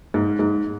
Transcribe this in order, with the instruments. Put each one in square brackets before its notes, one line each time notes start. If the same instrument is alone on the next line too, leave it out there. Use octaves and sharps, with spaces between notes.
[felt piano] G#2
G#2